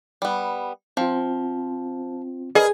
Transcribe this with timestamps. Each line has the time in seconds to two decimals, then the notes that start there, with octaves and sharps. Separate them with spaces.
0.22 G3 B3
0.97 F3 C4 F4
2.55 G#4 A#4 B4 D5 D#5 B5